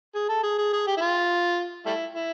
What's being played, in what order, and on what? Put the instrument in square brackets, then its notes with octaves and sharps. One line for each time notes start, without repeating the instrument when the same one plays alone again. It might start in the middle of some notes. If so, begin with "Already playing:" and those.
[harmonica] G#4
A4
G#4
G#4
G#4
G4
E4
F4
G3 A3 E4
E4